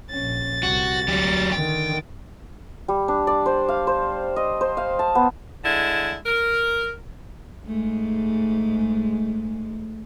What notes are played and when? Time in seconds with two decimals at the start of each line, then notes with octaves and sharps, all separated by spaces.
0.10 A#1 C#4 A6
0.63 C2 F#4
1.08 D2 F#3 G4
1.52 D3 D#3 G5
2.88 G3
3.08 D4
3.27 D5
3.46 C5
3.68 F5
3.87 C5
4.36 D#5
4.61 C5
4.77 F5
4.99 A5
5.15 B3
5.65 D3 G#3 E4
6.26 A#4
7.66 G#2 G#3 A3